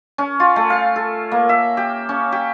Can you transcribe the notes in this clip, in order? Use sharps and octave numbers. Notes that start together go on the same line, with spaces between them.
C#4
F4
A3
F5
A4
A#3
E5
G4
C#4
G4